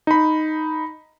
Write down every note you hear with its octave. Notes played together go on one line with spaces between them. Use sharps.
D#4 B5